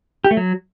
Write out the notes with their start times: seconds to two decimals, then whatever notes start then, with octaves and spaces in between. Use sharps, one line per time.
0.24 G4
0.31 A3
0.37 F#3